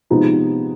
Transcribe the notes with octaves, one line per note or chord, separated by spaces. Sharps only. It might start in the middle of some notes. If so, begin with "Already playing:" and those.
C3 F3 G#3 B3 D#4